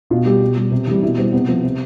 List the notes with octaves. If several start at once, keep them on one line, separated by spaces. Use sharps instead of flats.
B2 F4
G3 G4
B2
G3
C3
E3 G3
B2 E4
G3 C4
C3 B3
F3
C3